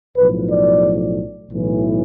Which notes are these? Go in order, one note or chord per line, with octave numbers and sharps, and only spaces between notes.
B1 A2 F3 B4
D5
B1 A2 E3